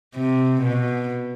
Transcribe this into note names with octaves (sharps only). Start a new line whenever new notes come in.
C3
B2